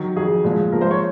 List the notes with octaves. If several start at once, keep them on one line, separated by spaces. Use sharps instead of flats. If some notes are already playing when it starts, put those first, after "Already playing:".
Already playing: D#3 F#3
F2 D#3 F#3 G#4
A#2 F3 G#3
A#2 F3 G#3 A#4
C5
C#5